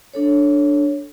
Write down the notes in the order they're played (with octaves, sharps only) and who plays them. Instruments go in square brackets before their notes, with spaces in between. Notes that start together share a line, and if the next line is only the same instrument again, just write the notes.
[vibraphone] D4 A4 C#5